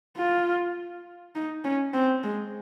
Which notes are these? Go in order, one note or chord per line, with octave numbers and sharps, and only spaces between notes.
F4
D#4
C#4
C4
G#3